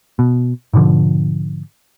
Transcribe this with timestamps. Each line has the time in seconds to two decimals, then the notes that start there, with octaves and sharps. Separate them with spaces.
0.19 B2
0.73 G#2 B2 D3 F3